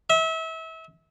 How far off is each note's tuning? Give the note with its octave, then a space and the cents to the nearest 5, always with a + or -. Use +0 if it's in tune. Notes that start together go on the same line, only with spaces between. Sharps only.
E5 -30